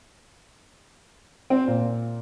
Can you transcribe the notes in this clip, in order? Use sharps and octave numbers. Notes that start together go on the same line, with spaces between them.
C4
A#2